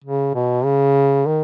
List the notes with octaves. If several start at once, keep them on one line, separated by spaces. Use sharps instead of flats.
C#3
B2
C#3
D#3